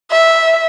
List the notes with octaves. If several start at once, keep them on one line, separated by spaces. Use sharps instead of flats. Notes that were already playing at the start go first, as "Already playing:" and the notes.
E5